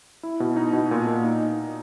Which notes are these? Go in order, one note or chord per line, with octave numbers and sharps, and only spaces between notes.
E4
B2
D#4
B2
A#2
A#2
D#4